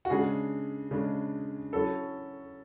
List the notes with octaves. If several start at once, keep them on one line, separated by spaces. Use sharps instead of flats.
F#4
C#3 G#3 D4 G#4
C#3 G#3 D4
F#3 C#4 E4 A4